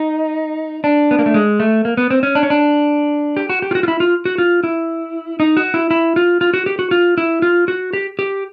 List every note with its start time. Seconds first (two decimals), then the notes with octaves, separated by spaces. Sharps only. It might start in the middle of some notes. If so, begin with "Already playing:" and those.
Already playing: D#4
0.84 D4
1.11 B3
1.19 A#3
1.26 A3
1.34 G#3
1.60 A3
1.85 A#3
1.97 B3
2.10 C4
2.23 C#4
2.35 D4
2.43 C#4
2.50 D4
3.37 G4
3.49 F#4
3.62 G4
3.71 F4
3.75 F#4
3.83 F4
3.88 E4
4.00 F4
4.25 F#4
4.38 F4
4.64 E4
5.40 D#4
5.57 F#4
5.74 E4
5.91 E4
6.16 F4
6.41 F4
6.54 F#4
6.66 G4
6.79 F#4
6.91 F4
7.18 E4
7.42 F4
7.68 F#4
7.93 G4
8.19 G4